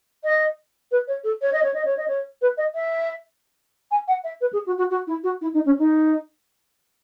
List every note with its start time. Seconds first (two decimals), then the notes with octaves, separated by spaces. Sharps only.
0.24 D#5
0.92 B4
1.08 C#5
1.24 A4
1.42 C#5
1.53 D#5
1.63 C#5
1.74 D#5
1.85 C#5
1.97 D#5
2.08 C#5
2.42 B4
2.57 D#5
2.75 E5
3.91 G#5
4.08 F#5
4.24 E5
4.41 B4
4.53 G#4
4.66 F#4
4.78 F#4
4.91 F#4
5.07 E4
5.24 F#4
5.41 E4
5.54 D#4
5.66 C#4
5.79 D#4